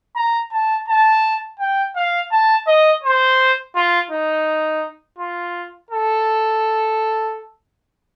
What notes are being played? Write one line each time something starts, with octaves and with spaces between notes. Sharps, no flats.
A#5
A5
A5
G5
F5
A5
D#5
C5
F4
D#4
F4
A4